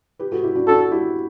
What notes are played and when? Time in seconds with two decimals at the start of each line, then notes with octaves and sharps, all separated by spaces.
0.19 G4 B4
0.32 F#4 A4
0.43 E4 G4
0.55 D4 F#4
0.67 D4 F#4 A4
0.91 E4 G4